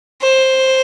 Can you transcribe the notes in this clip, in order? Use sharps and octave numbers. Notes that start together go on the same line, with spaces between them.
C5